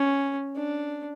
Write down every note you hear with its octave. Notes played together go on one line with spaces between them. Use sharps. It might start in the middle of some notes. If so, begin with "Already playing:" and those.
Already playing: C#4
D4